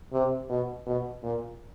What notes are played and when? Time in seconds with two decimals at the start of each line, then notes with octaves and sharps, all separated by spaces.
0.13 C3
0.49 B2
0.86 B2
1.23 A#2